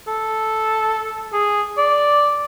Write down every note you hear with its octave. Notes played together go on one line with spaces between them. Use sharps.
A4
G#4
D5